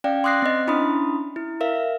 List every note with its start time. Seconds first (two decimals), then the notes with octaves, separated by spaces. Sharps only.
0.04 C#4 D5 F5 G5
0.24 C6 D6 D#6 F#6 A#6 C7
0.42 C4 D#5
0.67 C#4 D4 E4 B5 C6 D#6
1.36 E4
1.61 A#4 E5 F5